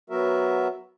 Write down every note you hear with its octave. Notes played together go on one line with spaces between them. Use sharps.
F#3 B3 F#4 A#4 E5